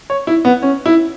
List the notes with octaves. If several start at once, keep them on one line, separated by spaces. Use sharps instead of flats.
C#5
E4
B3
C#4
E4